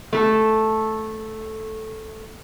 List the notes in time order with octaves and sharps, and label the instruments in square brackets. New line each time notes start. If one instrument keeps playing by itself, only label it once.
[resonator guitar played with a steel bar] A3 A4